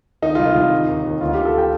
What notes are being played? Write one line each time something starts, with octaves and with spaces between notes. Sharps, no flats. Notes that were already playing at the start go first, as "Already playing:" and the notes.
D#3 D#4
C2 F4
D#4
C2
D#3
D#2
D#2
D2 F4
D#3 G4
A4
G5